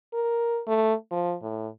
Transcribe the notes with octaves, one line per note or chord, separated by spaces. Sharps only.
A#4
A3
F3
A2